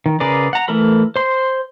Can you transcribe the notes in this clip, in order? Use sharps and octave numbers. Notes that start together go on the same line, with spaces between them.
D#3
C#3 G#4 A#4 B4 D5
F#5 A#5
E3 A3 A4 A#4 B5
C5 C6